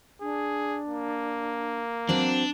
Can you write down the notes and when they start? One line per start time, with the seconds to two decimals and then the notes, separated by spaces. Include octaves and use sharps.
0.21 D4 G#4
0.88 A#3
2.09 F#3 C4 D4